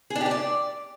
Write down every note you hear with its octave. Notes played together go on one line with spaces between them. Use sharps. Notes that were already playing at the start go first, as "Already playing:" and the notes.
G#4
D4
G4
D4
D5